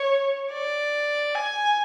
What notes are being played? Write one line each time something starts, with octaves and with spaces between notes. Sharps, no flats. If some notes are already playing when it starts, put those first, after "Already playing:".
Already playing: C#5
D5
G#5